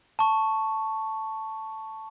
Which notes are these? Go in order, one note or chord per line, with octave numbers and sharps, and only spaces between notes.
A5 C#6